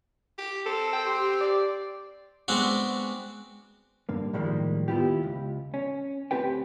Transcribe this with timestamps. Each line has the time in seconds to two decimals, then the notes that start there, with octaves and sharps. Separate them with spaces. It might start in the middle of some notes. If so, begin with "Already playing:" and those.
0.38 G4
0.66 C4 A4
0.93 G5
1.06 G4 C6
1.41 D5
2.48 G#3 B3 C4 D4 F#4
4.09 G2 D3 A#3
4.33 A2 D#3 F3 G3 G#3 A#3
4.88 D#2 B3 E4 F4 G4
5.23 C#2
5.74 C#4
6.31 D2 D#3 C4 G4 B4 G5